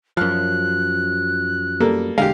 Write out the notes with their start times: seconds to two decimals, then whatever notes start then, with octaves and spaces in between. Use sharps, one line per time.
0.17 F#2 F3 F6 F#6
1.80 G3 A#3 A4
2.18 E1 D3 G#3 G4 F5